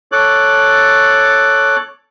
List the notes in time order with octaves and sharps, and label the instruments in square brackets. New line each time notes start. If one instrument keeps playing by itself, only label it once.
[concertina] A4 C#5 D6 F#6